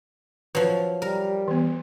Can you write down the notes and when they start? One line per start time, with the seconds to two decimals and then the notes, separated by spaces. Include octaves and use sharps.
0.55 F3 F#3 B4
1.02 G3 A#4
1.48 E3 B3